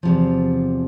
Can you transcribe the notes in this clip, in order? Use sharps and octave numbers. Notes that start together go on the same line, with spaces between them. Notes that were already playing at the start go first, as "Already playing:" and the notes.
E2 C3 F3